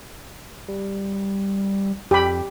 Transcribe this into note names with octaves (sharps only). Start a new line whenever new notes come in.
G3
F2 G4 B5